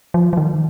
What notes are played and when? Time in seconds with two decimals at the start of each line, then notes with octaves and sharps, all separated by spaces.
0.14 F3
0.33 F3
0.37 D#3